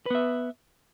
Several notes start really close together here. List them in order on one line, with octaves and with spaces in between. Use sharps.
B4 B3 E5